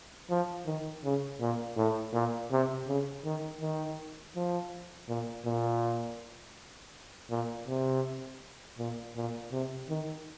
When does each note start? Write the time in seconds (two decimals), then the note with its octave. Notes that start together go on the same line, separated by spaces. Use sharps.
0.30 F3
0.66 D#3
1.04 C#3
1.40 A#2
1.77 A2
2.13 A#2
2.51 C3
2.87 C#3
3.25 D#3
3.61 D#3
4.36 F3
5.09 A#2
5.46 A#2
7.30 A#2
7.68 C3
8.78 A#2
9.16 A#2
9.52 C3
9.89 D#3